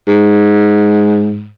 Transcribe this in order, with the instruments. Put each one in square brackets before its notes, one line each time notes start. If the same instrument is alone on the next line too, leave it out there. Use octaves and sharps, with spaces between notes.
[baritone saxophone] G#2